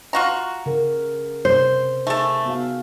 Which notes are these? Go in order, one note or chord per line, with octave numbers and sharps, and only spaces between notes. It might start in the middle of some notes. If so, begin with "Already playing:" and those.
F4 F#4 A#5
C#3 A#4
C3 C5
A3 D#4 G#4 A4
B3 F#4 F5